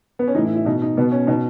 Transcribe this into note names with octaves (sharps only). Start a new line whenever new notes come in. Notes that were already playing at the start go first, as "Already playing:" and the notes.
B3
C#4
A2 E3 D#4
E4
E4
B2 D#4
D#4
B2 B3
C#4
B2 D#4